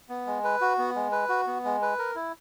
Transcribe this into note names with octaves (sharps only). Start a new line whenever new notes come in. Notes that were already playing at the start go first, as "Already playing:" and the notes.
B3
G#3
B4
F#4
B3
G#3
B4
F#4
B3
G#3
B4
A#4
E4